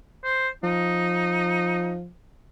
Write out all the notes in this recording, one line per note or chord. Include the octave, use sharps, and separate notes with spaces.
C5
F3 D#4